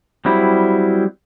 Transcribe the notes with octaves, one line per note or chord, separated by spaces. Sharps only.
F#3 G3 C4 E4